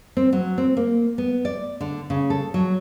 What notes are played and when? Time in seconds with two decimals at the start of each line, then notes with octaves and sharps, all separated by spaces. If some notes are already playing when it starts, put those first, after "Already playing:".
0.17 C4
0.33 F#3
0.58 C4
0.77 A#3
1.18 B3
1.45 D5
1.81 D3
2.10 C#3
2.30 A4
2.54 F#3